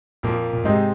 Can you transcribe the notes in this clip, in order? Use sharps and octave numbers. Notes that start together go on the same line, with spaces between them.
F2 A#2 F3 A#3
A#2
G#2 C3 G#3 C4 D#4